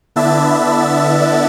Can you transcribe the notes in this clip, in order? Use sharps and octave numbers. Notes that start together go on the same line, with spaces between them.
D3 B3 D4 E4 E5 A6